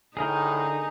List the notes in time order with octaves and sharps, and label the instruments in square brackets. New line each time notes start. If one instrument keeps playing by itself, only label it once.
[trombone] A2 [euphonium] D3 [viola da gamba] D#4 [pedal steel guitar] G#4 A#4 G5